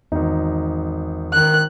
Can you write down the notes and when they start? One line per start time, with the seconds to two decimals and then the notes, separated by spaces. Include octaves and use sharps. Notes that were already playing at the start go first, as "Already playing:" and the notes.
0.12 G#1 E2 D#4
1.33 D#3 F#6